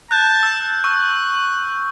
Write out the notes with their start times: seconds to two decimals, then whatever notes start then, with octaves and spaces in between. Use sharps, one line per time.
0.11 A5 F#6 G6
0.43 E6
0.84 C#6 E6 F#6